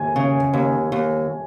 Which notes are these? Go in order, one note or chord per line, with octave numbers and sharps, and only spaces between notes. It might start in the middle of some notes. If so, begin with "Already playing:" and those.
Already playing: D#2 G#5
C#3
D#2
D#2